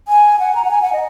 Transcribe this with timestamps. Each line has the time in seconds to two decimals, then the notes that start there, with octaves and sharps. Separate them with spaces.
0.08 G#5
0.39 F#5
0.55 A#5
0.64 F#5
0.71 G#5
0.82 F#5
0.93 D#5